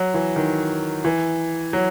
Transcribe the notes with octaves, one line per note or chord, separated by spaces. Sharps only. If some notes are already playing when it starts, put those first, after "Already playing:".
Already playing: F#3
E3
D#3
E3
F#3